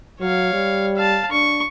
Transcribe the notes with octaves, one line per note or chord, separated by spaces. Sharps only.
F#3 C#5 F5
G3
F5 A5
D4 C#6